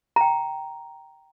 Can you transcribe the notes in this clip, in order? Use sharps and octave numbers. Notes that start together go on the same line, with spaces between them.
G5 A#5